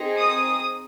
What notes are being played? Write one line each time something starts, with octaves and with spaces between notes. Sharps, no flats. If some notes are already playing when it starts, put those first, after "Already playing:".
Already playing: C4 D#4 G#4
D#6